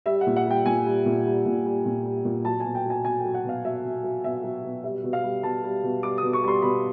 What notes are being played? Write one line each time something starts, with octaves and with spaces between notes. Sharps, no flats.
G3 E5
F#5
A#2
F#5
G3 G5
A#2 G#5
G3
A#2
G3
A#2
G3
A#2
G3
A#2
F#3 A5
B2 G#5
G5
F#3 G#5
B2 G#5
G5
F#3
F#5
B2 F5
F#3 E5
B2
F#3
B2 E5
F#3
B2
G3 E5
B2
F5
G3
B2 A5
G3
B2
G3 D6
B2 D#6
C#6
G3 C6
B2 B5